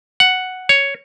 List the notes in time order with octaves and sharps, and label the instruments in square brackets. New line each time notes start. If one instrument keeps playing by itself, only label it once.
[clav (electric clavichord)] F#5
C#5